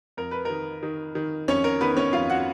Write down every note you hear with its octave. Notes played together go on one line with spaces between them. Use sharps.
F2 A#4
B4
D#3 A#4
D#3
D#3
F2 C#4 C#5
A#4
D#3 B3 B4
C#4 C#5
F2 F4 F5
F#4 F#5